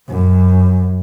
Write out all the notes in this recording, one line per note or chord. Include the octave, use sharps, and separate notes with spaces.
F#2